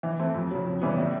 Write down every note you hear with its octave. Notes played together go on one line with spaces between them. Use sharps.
E3
A3 C4
F2
C#3 F#3
F2
C#3 E3 G3 B3
A2